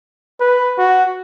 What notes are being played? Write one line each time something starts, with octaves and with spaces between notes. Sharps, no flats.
B4
F#4